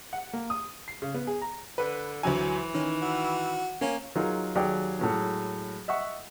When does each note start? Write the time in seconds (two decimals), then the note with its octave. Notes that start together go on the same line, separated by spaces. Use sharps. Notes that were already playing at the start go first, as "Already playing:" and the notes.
0.13 F#5
0.33 A#3
0.50 D#6
0.88 C7
1.02 C#3
1.15 B3
1.27 G#4
1.41 A#5
1.78 D3 B4
2.23 D2 E3 F#3 G#5
2.74 D#3 C#4
3.02 F#4
3.81 A#3 C#4
4.16 F#3 D#4 F4 G#4 A#4
4.55 D#2 F#3 G4 G#4 D5 G5
4.99 A2 F#3 G#3
5.88 D#5 E5 F#5 C#6